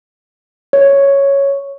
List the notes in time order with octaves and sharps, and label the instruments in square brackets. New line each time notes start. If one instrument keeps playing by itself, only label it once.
[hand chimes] C#5